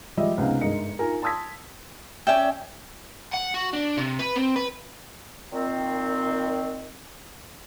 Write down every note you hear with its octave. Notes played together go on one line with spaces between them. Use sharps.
F3 G3 G#3 D#5 E5
C#2 C3 B3 D#4 F5
G1 G#2 G#3 A#4 D#5 C#7
D#4 F4 A#4 G#5
A5 C6 D#6 E6 G#6 B6
C#4 D5 E5 G5
F#5
F#4
D4
C3
B4
C4
B4
A#2 D#3 C4